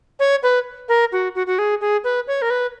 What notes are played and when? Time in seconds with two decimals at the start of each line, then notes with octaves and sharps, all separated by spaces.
0.19 C#5
0.43 B4
0.89 A#4
1.12 F#4
1.35 F#4
1.47 F#4
1.58 G#4
1.81 G#4
2.04 B4
2.27 C#5
2.42 A#4
2.50 B4